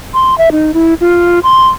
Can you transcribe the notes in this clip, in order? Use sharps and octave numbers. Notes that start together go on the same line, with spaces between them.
C6
E5
D#4
E4
F4
C6